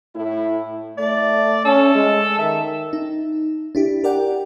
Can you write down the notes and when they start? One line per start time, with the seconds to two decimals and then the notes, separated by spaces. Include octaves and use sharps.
0.16 A2 E4
0.98 A3 D5
1.65 C#4 A4
1.95 G#3
2.39 D#3 E5
2.93 D#4
3.75 D4 E4 G4
4.04 G4 A#4 D5 F#5 G5